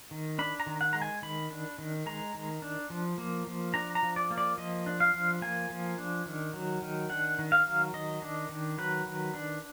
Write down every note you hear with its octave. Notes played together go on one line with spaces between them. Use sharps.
D#3
D4 B5
A#5
D#3
F#5
G#3 A#5
G#5
D#3 B5
D4
D#3
G#3 A#5
D#3
D4
F3
A#3
F3
D4 A#5
A#5
F3
D5
A#3
D5
F3 D#5
D4
F5
F3
A#3 G#5
F3
D4
D#3
F#3
D#3
D4 F#5
D#3
F5
F#3
D#3 D#5
D4
D#3
F#3 B4
D#3
D4